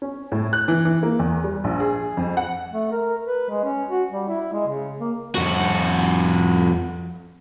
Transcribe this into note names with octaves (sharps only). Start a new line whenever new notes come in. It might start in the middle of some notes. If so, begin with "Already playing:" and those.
C#4
A2
F#6
E3
E3
A#3
E2
G3
A#1
G#4
F2
F#5
A3
A#4
B4
G#3
C#4
F#4
G3
E4
G#3
C#3
A#3
F2 F#4